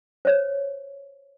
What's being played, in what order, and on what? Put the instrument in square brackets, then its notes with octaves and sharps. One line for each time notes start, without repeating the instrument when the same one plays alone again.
[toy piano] C5 C#5